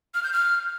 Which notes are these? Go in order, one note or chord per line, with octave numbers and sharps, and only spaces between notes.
F6
G6
F6